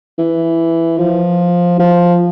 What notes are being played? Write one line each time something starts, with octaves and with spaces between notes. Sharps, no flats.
E3
F3
F3